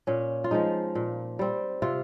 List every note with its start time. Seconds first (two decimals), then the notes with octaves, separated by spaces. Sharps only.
0.07 A#2 C#4
0.44 F4
0.51 F3 G#3 D#4
0.95 A#2
1.39 G3 C4
1.82 C3 F4